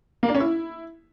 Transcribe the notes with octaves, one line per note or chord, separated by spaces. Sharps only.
A#3
D4
C#4
E4